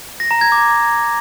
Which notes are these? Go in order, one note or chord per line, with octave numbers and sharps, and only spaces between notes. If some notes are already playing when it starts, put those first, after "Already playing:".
A#6
A#5
G#6
D6